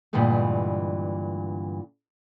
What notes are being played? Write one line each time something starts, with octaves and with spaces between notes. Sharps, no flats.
G2 A#2 D3 E3 G#3 A3